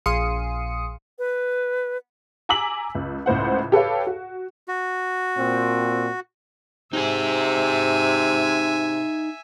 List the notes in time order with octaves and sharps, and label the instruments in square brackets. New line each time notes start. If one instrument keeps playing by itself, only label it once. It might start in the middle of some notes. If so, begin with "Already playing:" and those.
[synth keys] A#1 G#4 F5 C6 D#6 C#7
[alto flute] B4
[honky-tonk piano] G#5 A#5 D6 E6 B6 F#7
C#2
C#2 A2 C5 F#5
G4 A4 B4 C#5 F5
F#4
[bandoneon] F#4
[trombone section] A#2 C4
[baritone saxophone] C3 [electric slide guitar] D#4 G#4 [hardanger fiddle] E5 G#5